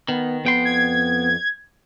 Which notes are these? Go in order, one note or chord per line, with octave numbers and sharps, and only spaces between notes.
D#3 B3
F2 B3 G5 C6
G#6